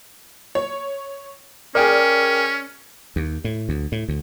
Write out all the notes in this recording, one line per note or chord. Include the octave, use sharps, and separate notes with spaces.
C#5
C#4 G#4 A#4 D5 G5
D#2
A2
D2
A2
D2